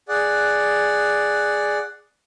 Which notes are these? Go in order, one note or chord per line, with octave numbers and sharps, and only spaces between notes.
G#4 D5 F#5